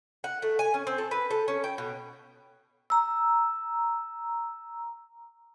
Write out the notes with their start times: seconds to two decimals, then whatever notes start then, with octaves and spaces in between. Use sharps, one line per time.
0.24 F#5
0.42 A3
0.59 G#5
0.74 C#4
0.87 C4
0.98 A4
1.11 B4
1.30 A4
1.48 C#4
1.64 G5
1.78 B2
2.90 A#5 E6